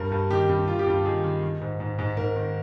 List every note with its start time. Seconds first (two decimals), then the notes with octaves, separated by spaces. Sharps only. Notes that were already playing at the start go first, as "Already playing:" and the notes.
Already playing: G2 A#4
0.12 G2
0.30 D#3 G4
0.49 G2
0.68 D#3 F4
0.79 G4
0.87 G2 F4
1.05 D#3 G#4
1.24 D#3
1.43 D#3
1.61 G#2
1.80 G#2
1.99 G#2
2.17 G#2 A#4
2.36 D#3